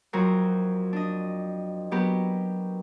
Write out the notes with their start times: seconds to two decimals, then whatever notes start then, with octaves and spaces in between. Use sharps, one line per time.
0.13 F2 F#3 F#4 A#4 C5
0.93 D4 D#5
1.91 F#3 B3 G4 A#4 B4